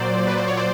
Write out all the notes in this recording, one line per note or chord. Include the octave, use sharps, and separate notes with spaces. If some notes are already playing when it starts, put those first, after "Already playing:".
Already playing: A#2 F#3 C5 D5
B4
C5
C#5
C5 D5